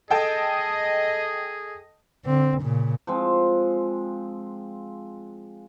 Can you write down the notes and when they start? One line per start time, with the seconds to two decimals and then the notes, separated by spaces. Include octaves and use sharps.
0.10 G#4 A4 D#5 G5 A5
2.25 D3 C4
2.62 A#2 C#3
3.07 F3 G#3 C4